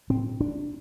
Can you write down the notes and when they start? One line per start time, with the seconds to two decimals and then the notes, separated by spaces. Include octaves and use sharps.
0.10 A2 C4
0.40 D4